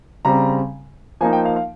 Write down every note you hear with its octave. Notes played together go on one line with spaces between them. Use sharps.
C#3 G3 C4 A#5
F3 A#3 D#4 G#5
G5
F5
F5